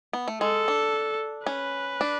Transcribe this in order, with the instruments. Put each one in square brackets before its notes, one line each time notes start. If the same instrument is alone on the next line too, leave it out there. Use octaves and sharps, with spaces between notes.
[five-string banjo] B3
A3
[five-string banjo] G#3 [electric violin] A4
[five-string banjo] D4
[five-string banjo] C#4 [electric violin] B4
[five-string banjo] D4